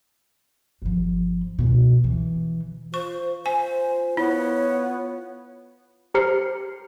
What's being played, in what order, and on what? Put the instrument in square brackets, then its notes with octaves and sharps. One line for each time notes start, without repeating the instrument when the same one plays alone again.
[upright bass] G1 F3
C#2 B2
E3
[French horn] F4 [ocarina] C5 [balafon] C#6
[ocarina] C5 [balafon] G#5
[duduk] B3 [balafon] E4 [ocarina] C#5
[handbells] G4 C5 A#5 F6 C7 C#7